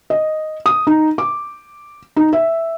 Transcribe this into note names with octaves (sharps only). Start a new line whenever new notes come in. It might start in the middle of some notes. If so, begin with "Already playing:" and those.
D#5
D#6
D#4
D6
D#4
E5